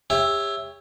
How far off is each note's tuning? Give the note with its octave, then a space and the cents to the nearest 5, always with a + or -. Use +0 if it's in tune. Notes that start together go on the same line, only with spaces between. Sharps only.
G4 +40 C#5 +0 E5 +0